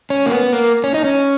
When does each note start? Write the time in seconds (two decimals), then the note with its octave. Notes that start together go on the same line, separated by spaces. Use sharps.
0.10 C#4
0.26 A#3
0.31 B3
0.52 A#3
0.84 C#4
0.94 D#4
1.04 C#4